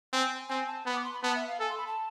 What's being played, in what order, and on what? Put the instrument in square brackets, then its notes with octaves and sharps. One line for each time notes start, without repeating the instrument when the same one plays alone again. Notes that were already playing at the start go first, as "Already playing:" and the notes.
[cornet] C4 [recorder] G#5
[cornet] C4 [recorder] G#5
[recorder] A5
[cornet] B3 [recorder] B5
[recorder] D6
C6
B5
[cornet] B3 [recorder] A5
[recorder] E5
F5
[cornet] A4 [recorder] G#5
[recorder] C6
B5
A5